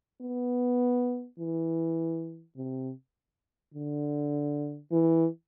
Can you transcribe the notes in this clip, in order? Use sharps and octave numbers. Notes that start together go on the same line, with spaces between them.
B3
E3
C3
D3
E3